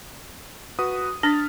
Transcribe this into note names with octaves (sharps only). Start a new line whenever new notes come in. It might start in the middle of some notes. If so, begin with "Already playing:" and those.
F#4 B4 D#6
D4 F6 A6 B6